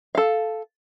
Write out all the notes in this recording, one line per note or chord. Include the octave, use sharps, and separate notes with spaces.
A4 F5